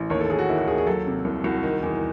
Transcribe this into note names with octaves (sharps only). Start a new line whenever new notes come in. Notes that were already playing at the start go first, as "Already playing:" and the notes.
Already playing: A1
D#2 C#5
A4
D#2 G#4
F#4
D#3 E4
F#4
D#2 G#4
G#4
F#3 A4
C3
C2
C2 F#4
D#3
E2